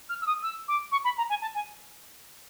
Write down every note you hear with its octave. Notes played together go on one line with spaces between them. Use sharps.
F6
E6
D#6
E6
D6
C#6
B5
A#5
G#5
A5
G#5